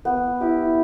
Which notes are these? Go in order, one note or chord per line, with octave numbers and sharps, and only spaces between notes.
B3
E4 G4